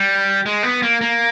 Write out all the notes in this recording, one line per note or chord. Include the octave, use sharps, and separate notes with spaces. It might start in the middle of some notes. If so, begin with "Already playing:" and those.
Already playing: G3
G#3
B3
A#3
A#3